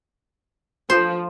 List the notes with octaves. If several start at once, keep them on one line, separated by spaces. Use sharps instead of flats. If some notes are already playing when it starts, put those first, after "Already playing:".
F3 C5